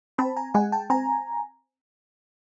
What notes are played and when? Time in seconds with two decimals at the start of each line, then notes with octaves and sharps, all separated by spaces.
0.18 C4 A5 B5
0.36 G#5 A#5
0.54 G#3 F#5 G#5
0.72 G5 A5
0.90 C4 G#5 A#5